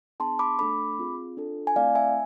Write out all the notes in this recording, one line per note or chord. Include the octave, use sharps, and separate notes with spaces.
B3 D4 G#4 A5 C6
B5 D6
A3 D4 A4 B5 D6
C4 F4 G#4
D4 F4 A4
G#5
A3 C4 E4 D5 F5
E5 G#5